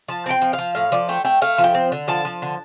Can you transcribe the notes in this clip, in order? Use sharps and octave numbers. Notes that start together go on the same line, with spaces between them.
F3 A5
C4 G5
F3
F5
F3
A2 F5
F3 D5
A3 G5
A3 G5
A3 F5
F3
G5
C4
D3
F3 A5
F3
D3